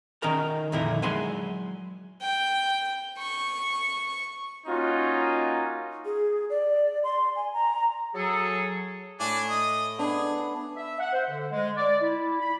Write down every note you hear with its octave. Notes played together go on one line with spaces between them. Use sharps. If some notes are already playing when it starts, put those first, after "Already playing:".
D#3 C#4 D#4 A#4 A#5
F2 A#2 D3 D#4 E4 A#4
F#3 G#3 G#5 B5 C6
G5
C#6
A#3 C#4 D#4 F4 F#4
G#4
D5
C6
G#5
A#5
F#3 G#4 A4
A2 D4 G#5 D6
D#5 D#6
B3 D4 G#4
E5
F#5
C5
D3
G#3
D5
E4
B5